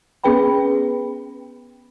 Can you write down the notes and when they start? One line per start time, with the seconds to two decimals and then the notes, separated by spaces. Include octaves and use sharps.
0.24 B3 C#4 G#4 B4 G5 B5